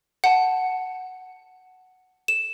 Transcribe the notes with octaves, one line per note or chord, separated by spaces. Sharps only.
F#5 A5
E7